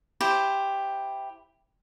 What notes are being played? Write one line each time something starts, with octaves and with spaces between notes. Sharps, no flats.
E4 G4 C5